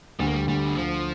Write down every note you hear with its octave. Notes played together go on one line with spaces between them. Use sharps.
D2 G3
A#3
G3
D2 G3
D3
D2 F3